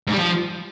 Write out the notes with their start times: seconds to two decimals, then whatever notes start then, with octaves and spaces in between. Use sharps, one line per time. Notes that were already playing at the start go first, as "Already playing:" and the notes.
0.07 G#2
0.12 G3
0.17 F3